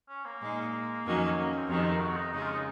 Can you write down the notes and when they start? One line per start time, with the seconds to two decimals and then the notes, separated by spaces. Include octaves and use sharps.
0.09 C#4
0.25 A#3
0.41 A#2 G#3 D#4
1.05 F2 D#3 F#3 C#4
1.45 A#3
1.57 C4
1.68 F2 C3 D#3 C#4
1.79 F4
1.85 D#4
2.00 F#4
2.16 D#4
2.33 C#3 G#3 C#4 D#4
2.43 F4
2.53 D#4